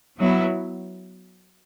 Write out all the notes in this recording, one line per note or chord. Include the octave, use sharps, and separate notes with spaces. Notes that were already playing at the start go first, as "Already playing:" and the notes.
F#3 B3 E4